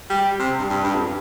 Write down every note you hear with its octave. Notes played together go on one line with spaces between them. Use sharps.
G3
C3
G2
G2
G2
F2